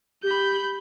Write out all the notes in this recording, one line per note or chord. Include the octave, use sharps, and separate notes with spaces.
G4 B5 G6